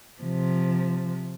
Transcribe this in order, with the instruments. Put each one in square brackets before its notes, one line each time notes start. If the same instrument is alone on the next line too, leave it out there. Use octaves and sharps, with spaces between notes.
[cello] C3 F3